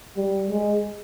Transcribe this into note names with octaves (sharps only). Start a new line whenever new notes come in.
G3
G#3